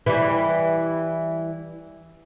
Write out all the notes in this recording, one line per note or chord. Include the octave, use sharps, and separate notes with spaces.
E3 G3